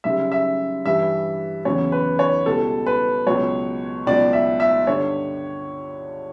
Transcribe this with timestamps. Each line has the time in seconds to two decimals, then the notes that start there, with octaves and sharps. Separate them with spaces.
0.04 F#2 C#3 G3 E5
0.32 E5
0.85 G2 E3 G3 E5
1.65 E2 C#3 F#3 C#5
1.92 B4
2.19 C#5
2.46 C#2 B2 G3 A4
2.86 B4
3.26 C#2 B2 F#3 C#5
4.07 C#2 B2 F#3 D5
4.33 E5
4.60 E5
4.87 G2 D3 G3 C#5